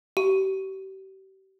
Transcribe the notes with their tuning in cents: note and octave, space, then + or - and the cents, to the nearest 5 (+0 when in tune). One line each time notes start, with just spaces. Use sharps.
G4 -35